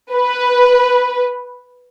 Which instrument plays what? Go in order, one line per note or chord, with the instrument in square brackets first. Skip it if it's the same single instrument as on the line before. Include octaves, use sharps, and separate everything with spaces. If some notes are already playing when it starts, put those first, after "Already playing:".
[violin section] B4